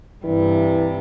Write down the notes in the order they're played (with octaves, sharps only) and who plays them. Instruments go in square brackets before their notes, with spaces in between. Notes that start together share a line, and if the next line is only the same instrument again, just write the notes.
[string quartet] G2 C3 G3 [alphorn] E3